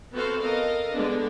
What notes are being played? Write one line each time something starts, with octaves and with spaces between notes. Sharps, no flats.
B3 C4 F#4 A4 C5 F5
A4 A#4 D#5 F5
D3 G#3 B3 D4